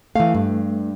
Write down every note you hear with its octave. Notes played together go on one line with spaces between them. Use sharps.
E3 A3 F5
G2